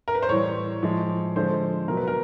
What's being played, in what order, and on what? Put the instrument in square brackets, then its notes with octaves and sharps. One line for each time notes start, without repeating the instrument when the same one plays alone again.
[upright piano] A#4
B4
C5
A2 E3 G3 C#5
A2 F3 G#3
D3 F3 G#3 C5
B2 F#3 A#4
B4
A#4